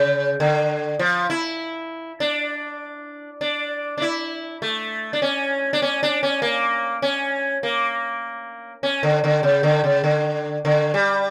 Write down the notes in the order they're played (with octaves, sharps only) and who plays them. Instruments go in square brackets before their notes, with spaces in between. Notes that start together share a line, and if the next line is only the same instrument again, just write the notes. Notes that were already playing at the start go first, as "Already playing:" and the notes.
Already playing: [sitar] C#3
D3
F3
E4
D4
D4
D4
E4
A3
D4
C#4
D4
C#4
D4
C#4
A#3
C#4
A#3
C#4
D3
D3
C#3
D3
C#3
D3
D3
G3